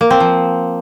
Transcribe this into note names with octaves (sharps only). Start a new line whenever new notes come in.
A#3
C4
F3